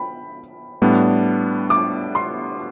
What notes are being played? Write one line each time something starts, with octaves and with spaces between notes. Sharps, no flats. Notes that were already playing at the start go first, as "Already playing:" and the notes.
Already playing: G5 B5
A2 G3 B3 D4
D6
C6